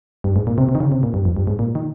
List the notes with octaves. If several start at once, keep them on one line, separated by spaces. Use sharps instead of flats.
G2
G#2
A#2
C3
C3
D#3
C#3
C3
A#2
G2
F2
G2
G#2
A#2
D#3